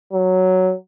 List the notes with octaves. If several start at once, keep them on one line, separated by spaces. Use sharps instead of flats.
F#3